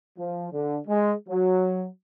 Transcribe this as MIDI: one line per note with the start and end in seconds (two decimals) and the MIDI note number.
0.18 0.47 53
0.53 0.78 50
0.88 1.13 56
1.28 1.87 54